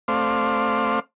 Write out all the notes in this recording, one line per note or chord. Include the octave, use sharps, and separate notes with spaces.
A3 C4 C5 D5 F5